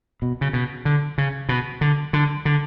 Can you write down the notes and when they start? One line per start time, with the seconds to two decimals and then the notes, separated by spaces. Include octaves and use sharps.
0.22 B2
0.41 C#3
0.53 B2
0.85 D3
1.18 C#3
1.49 B2
1.81 D3
2.13 D3
2.45 D3